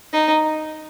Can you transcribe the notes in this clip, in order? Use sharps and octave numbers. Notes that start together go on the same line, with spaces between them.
D#4